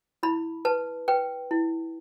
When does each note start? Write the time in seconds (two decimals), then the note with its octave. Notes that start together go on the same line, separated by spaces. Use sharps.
0.23 E4 B5
0.65 B4 A5
1.08 B4 G5
1.51 E4